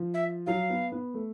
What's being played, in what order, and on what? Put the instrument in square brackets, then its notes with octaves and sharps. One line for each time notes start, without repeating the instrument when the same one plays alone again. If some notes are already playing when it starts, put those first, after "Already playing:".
Already playing: [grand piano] F3
[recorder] E5
[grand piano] F#3 [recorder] F5
[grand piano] B3
B3
A3